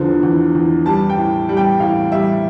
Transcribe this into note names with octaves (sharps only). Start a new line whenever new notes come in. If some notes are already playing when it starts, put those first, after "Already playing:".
Already playing: E2 D3 F3
E2
E2
G3 A5
G5
A2
G3
G5
A2 F5
G3 E5